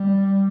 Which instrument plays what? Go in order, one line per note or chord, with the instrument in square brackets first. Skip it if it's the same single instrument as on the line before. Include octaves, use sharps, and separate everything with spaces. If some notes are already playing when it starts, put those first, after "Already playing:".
Already playing: [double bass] G3